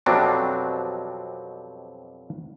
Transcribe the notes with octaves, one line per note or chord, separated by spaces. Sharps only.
F2 B2 F#3 G3 C4 D4